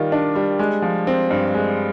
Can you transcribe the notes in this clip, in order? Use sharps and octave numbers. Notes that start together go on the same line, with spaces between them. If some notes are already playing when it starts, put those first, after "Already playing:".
Already playing: D#3 G3 F4
D4
G3
G#3
F3
C4
G2
G#3